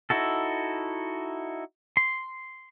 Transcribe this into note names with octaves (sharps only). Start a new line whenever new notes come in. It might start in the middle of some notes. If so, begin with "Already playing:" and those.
D#4 E4 F#4 A4
C6